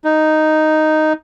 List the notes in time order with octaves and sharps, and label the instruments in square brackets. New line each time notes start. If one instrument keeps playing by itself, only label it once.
[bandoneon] D#4